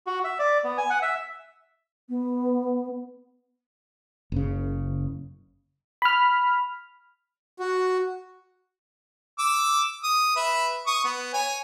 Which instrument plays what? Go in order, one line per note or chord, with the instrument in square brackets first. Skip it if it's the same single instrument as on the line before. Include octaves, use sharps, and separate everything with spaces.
[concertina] F#4
E5
D5
B3
G#5
F#5
E5
[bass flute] B3
[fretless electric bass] F#1 C#3
[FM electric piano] B5 F6
[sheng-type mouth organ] F#4
[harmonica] D6 E6
D#6
B4 E5
C#6 D#6
B3
C#5 G#5